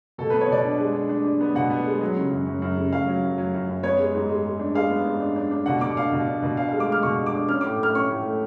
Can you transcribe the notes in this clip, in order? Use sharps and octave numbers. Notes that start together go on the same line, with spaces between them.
B2 A4
B3 B4
C#5
B2 D5
D4
G#3
D4
D4
D4
B3
B2 F#5
B3
G#3
F#3
C#3
F#2
F#2
F#2
C#3
F#2 F5
F#3
F#2
F#3
F#2
F#2
B3 C#5
G#3
G#2
G#3
G#3
D4
G#3 F5
B3
G#2
D4
D4
D4
B2 F#5
B2 D6
D4 F5
B2
D4
B2
D4 F5
G#3 F5
D6
G#3 F6
B2 C#6
D4
D6
D4
C#4 F6
A2 D6
A3 F6
C#4 C#6
A2
A3